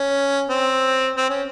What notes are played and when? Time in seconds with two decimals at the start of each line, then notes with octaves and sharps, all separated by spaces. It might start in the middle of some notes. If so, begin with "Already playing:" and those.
Already playing: C#4
0.49 C4
1.16 C4
1.30 C#4